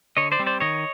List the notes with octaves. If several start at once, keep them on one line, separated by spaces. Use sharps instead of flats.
D3 C#5 D#5
C5 D5
G3 C4
C5 D5
D#3 C#5 D#5